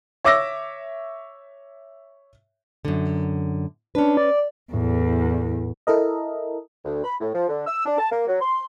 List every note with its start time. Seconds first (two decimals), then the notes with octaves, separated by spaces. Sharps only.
0.24 C#5 E5 D6 E6 A#6
2.85 F#2 D3
3.95 C#4 D4 B4
4.17 D5
4.73 E2 A2
5.87 E4 A4 A#4 D#5
6.85 D2
7.04 B5
7.21 A2
7.35 F3
7.49 D3
7.67 E6
7.86 D4
7.98 A5
8.12 A#3
8.27 F#3
8.41 C6